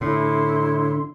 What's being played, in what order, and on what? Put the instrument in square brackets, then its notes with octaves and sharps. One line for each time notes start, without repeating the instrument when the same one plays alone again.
[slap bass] A2 [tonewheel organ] D3 [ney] E4 [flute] C6